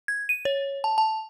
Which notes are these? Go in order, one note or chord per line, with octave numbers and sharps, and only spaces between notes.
G#6
D#7
C#5
A5
A5